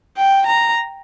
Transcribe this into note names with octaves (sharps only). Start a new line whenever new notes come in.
G5
A#5